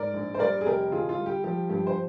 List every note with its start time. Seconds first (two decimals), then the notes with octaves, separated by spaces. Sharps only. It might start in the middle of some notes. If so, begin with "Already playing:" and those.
Already playing: G#2 A#4 D5
0.14 A#1
0.34 C5
0.39 G3 A#4 D5
0.61 G#4
0.65 F1 G4 A#4
0.91 D3 F4 G#4
1.09 F4
1.18 G3
1.26 G4
1.44 F3 G4
1.69 G2 G4
1.87 C5